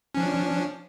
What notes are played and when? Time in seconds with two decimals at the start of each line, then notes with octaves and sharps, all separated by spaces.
0.15 C#4
0.17 F3
0.20 D4